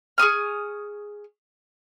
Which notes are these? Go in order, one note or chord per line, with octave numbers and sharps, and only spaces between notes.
G#4 C#6 D#6 F6